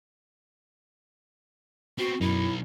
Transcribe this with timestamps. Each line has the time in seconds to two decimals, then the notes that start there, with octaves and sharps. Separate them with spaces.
1.98 B3 C4 F#4
2.21 B1 F#2 D#4 E4